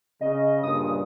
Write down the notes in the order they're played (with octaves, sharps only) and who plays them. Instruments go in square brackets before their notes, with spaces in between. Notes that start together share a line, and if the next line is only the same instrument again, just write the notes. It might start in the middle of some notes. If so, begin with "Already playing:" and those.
[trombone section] C#3 [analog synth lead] D#5
[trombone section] G2 A#2 C#3 [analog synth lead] D#6